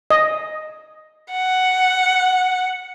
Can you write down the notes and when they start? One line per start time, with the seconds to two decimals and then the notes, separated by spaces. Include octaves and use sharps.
0.10 D#5
1.32 F#5